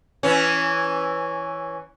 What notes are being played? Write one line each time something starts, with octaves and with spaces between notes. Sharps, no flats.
E3 C#4